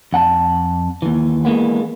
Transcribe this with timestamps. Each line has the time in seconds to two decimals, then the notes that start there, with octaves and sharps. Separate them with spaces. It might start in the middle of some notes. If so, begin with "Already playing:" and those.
0.13 F2 F#5 A5
1.02 D#2 E3
1.45 E3 G#3 A#3 B3